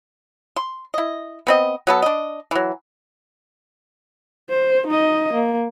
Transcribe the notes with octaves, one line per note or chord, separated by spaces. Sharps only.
C6
E4 D#5
B3 C4 D#5
F#3 B3 A4
D4 D#5
E3 F#3
C5
D#4 D#5
A#3